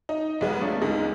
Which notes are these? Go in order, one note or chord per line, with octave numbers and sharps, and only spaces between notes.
D#4
B1 G#3 B3
F#3 A3 D4 F4
C#2 G#3 D#4 A#4